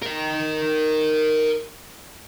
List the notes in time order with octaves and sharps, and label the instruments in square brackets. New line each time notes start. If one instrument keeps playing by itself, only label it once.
[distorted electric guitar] A#4 D#5